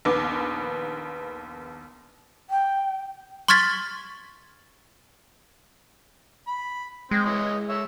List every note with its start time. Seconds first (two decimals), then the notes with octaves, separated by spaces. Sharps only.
0.05 A#1 D#2 B3 D6
2.50 G5
3.48 C6 C#6 F6 G#6 A6 B6
6.48 B5
7.11 G#3 C4 C5
7.25 E3 C#5 D#5
7.69 C#5 E5